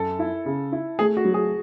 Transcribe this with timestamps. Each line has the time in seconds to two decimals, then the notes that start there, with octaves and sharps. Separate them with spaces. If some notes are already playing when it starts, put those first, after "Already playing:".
Already playing: F#2 A4
0.19 E4
0.45 C#3
0.72 E4
0.99 A3 G#4
1.17 F#4
1.25 F#3
1.34 G#4